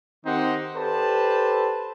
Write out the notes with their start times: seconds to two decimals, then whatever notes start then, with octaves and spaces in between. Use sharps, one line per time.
0.24 D#3 C4 D#4 G4 C5 F#5
0.75 G4 A4 B4 C5 D5 A5